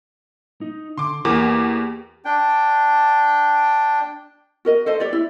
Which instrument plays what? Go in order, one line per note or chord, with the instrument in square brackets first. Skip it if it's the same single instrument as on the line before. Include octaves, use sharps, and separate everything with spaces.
[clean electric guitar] D#4
[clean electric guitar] D3 [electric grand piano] C6 D6
[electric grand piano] E2 A#3 D6 [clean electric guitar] G4 G#4
[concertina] D4 G5
[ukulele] F#4 A#4 D#5
A4 C5 D#5
G4 C#5 D5
E4